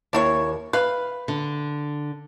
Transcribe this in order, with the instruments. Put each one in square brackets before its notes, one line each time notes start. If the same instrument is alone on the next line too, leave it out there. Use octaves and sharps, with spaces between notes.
[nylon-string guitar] D#2 [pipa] D4 E4 C#5
[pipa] B4 [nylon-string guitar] F5
[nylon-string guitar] D3